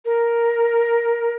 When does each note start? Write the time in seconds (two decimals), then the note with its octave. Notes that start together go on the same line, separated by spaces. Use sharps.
0.05 A#4